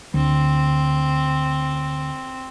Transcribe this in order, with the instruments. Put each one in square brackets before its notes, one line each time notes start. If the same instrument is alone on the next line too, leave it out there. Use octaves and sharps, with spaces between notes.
[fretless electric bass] D2 [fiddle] C4